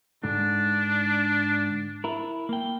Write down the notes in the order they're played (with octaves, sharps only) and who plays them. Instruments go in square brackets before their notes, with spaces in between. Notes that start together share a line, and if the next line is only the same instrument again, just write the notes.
[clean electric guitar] G#2 D3 [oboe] D4
[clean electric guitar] E4 A#4
A#3 G5